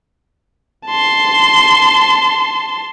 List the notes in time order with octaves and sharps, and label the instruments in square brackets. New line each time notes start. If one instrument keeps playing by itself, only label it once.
[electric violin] A5 C6